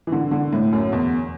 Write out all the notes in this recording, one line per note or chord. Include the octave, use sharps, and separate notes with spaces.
E3
D3
D3
A2
F#2
E2